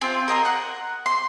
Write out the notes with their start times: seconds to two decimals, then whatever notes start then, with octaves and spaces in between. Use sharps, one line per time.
0.01 C4 F4
0.28 A#4 D#5 G#5 C6
0.45 F#5 F#6
1.06 C6